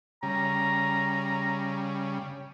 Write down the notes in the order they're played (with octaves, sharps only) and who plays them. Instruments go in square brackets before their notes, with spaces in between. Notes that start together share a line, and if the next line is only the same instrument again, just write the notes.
[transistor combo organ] C#3 G3 [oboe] A#5